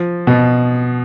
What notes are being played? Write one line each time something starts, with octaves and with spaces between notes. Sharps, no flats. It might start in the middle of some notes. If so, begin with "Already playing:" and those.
Already playing: F3
B2